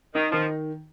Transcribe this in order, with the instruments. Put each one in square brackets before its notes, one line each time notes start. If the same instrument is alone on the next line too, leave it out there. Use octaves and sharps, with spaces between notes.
[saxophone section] D#3 [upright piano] D#4
[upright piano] D#3 [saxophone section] F3